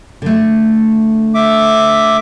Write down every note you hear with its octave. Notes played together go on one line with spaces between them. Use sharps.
D3 A3
E5 D6